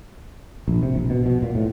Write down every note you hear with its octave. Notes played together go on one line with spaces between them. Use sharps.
A#1
C3
A#1
B2
B2
A#2
A2